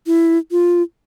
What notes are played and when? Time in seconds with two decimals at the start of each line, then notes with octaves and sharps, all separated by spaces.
0.07 E4
0.51 F4